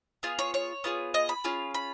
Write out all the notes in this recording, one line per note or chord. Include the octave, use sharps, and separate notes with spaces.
B3 F4 G#4
C#5
C#5
B3 F4 G#4
D#5
B5
C#4 F4 G#4
B5